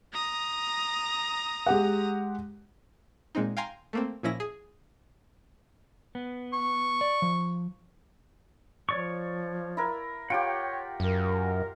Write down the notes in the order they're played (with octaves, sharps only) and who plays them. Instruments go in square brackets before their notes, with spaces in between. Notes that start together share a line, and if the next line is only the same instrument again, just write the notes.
[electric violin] A#5 D#6
[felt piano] G#3 G4 F#5
[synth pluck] A#2 G#3 C4 D#4
F5 G5 G#5 A#5 C6
A3 A#3 C4
A#2 F3 C#4 E4 A#6
G#4
[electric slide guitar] B3
[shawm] C#6
[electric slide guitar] D5
F3
[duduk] F3 [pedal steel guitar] C#5 D5 C#6
[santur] E4 A#4
[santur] F4 G4 [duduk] C#5 [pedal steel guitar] F#5 G5
[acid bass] F#2 [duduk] A#4